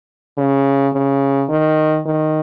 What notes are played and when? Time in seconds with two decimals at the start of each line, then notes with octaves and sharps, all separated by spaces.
0.38 C#3
0.94 C#3
1.49 D#3
2.06 D#3